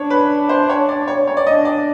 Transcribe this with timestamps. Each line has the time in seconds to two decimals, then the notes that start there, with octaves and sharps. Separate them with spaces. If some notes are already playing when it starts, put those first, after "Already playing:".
Already playing: D4 C#5
0.10 B4
0.49 C5
0.69 C#5
0.89 D5
1.08 C#5
1.27 C#5
1.37 D5
1.47 D4 D#5
1.65 D5